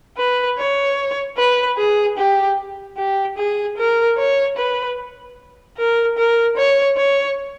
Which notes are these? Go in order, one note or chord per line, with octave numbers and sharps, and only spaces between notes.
B4
C#5
B4
G#4
G4
G4
G#4
A#4
C#5
B4
A#4
A#4
C#5
C#5